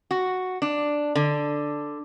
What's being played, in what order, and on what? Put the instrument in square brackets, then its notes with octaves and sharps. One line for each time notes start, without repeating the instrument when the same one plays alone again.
[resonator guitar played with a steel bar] F#4
D4
D3